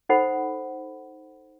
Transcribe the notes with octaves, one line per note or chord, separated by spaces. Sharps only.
D#4 A4 C5 F#5 B5